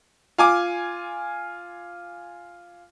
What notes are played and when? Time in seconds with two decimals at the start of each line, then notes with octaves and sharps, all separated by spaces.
0.38 F4 G#5 D6